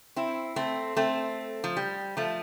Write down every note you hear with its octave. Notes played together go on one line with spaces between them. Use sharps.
C4 E4
A3 C4
A3 C4
F3
G3
F3 A3